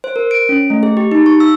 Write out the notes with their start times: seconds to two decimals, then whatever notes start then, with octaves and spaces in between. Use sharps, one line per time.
0.04 C5
0.16 A#4
0.31 D7
0.49 C#4
0.70 A3
0.83 G#4
0.97 G4
1.11 D#4
1.26 C#6
1.40 E6